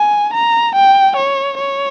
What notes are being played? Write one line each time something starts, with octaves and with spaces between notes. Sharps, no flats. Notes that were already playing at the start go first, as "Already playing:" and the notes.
Already playing: G#5
A#5
G5
C#5
C#5